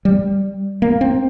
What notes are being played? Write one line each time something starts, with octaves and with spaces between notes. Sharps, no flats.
G3
A#3
C4